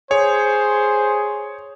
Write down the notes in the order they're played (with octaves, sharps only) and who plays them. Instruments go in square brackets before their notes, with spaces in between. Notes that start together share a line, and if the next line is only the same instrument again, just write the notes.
[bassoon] G#4 [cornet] C5 [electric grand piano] C#5